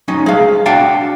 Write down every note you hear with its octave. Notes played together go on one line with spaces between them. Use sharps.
F#3 C#4 D#4
G#3 F5
D4 F#4 F5 G5 A5